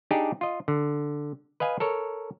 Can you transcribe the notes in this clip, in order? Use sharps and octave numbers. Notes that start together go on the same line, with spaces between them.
D4 D#4 G4 G#4 D5
F4 D#5
D3
B4 D#5 F5 G#5
A4 A#4 C#5